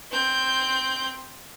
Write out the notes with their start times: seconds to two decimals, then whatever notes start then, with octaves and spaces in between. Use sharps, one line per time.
0.11 C4 G6